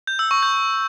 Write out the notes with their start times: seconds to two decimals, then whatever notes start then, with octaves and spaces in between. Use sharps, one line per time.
0.07 G6
0.19 E6
0.31 C#6
0.43 G6